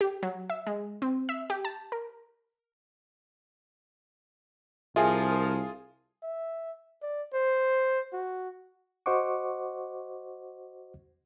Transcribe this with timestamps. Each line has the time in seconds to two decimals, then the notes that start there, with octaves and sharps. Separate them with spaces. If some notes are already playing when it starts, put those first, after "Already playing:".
0.01 G4
0.23 F#3
0.50 E5
0.67 G#3
1.02 C4
1.29 E5
1.50 G4
1.65 A5
1.92 A#4
4.96 C2 F3 F4 G#4 A#4 E5 G#5
6.23 E5
7.02 D5
7.34 C5
8.13 F#4
9.06 F#4 C5 D#5 F#5 C#6 D6